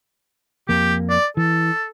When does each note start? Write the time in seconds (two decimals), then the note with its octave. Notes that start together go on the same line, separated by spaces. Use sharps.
0.69 F2 A#3 G4
1.10 D5
1.37 E3 A4